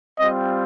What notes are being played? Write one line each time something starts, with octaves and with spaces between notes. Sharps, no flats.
G3 C4 F4 D#5